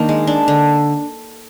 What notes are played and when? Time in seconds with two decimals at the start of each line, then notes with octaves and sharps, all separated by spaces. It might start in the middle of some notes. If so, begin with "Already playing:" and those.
Already playing: D#3 A#3 D4
0.09 G#3
0.27 D4
0.48 D3